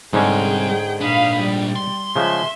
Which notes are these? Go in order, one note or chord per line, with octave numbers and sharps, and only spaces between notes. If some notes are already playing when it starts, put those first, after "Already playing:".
G#2 D3 G3 C4 C#4 G#4 G5
A#2 D4 F5 B5 D#6
G3
C6
C#3 F3 G#3 E5